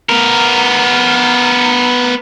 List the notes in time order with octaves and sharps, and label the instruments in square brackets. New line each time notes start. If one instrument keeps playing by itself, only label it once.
[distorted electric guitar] B3 A#4